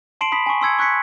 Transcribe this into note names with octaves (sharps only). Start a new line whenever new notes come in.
A5 C6 C7 D7 E7 F#7
B5 D#6 B6
G#5 C#6
C6 E6 G#6 C#7
C#6 F#6 G#6 B6 C#7